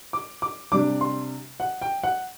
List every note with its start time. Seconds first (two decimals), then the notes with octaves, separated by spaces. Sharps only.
0.13 D6
0.42 D6
0.72 C3 G3 D4 D6
1.01 C6
1.60 F#5
1.82 G5
2.03 F#5